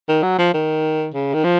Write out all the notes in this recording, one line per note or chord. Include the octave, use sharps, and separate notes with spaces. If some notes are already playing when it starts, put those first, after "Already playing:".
D#3
F#3
F3
D#3
C#3
D#3
F3